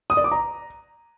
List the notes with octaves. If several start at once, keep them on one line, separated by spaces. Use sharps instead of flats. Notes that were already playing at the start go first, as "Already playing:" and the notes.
D#6
D5
D6
A#5